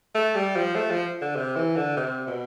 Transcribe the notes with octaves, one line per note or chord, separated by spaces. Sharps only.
A3
G3
F3
A3
F3
D3
C3
E3
D3
C3
B2